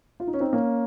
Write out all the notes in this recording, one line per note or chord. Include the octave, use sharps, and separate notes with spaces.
F4
D#4
C#4
C4 D#4
A#3 C#4